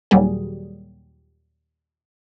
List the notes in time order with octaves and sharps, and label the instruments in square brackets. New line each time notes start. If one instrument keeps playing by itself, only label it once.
[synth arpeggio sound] D#2 A#2 F#3 G3 G#4